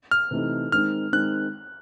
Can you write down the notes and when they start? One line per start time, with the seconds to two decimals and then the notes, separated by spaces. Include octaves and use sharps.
0.11 F6
0.31 C3 E3 A3 C4 D#4
0.72 D#3 G#3 C4 D#4 F6
1.13 D#3 G#3 C4 D#4 F#6